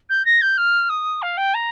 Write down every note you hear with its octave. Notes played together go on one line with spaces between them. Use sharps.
G6
A#6
G6
F6
D#6
F5
G5
A#5